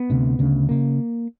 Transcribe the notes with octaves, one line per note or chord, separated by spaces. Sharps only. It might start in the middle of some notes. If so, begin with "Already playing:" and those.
Already playing: B3
D2 C3
D2 C#3
C#3 A#3